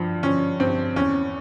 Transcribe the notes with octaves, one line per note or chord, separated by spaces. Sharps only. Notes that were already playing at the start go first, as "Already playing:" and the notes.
Already playing: G2 F3
F3 C#4
G2 C4
E2 C#4